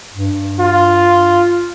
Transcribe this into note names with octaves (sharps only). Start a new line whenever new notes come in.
G2
F4